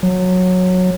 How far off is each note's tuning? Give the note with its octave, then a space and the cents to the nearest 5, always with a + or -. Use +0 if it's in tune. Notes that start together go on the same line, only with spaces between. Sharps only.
F#3 -15